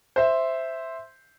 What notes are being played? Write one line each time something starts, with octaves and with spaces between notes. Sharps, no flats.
C5 E5